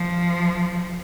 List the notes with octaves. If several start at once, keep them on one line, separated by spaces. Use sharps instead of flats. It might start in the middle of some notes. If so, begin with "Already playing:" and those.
Already playing: F3